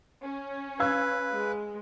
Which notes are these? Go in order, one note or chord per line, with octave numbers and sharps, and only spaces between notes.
C#4
B4 F5 E6 G#6
G#3